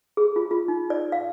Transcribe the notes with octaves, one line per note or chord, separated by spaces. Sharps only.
G#4
F4
F4
D#4
D5
F5